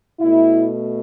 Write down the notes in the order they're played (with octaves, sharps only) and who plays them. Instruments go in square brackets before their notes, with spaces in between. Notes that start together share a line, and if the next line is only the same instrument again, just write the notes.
[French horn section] B2 A3 E4